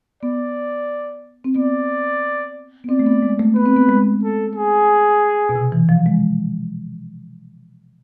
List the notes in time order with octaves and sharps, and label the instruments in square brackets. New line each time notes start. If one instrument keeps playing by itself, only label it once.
[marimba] B3 [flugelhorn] D5
[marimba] C4
[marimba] B3 [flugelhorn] D5
[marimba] B3
[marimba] C4 [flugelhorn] D5
[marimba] A3
B3
G#3
A3
[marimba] B3 [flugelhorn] B4
[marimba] C4
B3
G#3
[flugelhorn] A4
G#4
[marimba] B2
C3
E3
F3
G#3